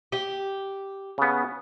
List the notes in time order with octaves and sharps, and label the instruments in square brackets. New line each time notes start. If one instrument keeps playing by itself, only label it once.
[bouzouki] G4
[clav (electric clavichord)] C#3 B3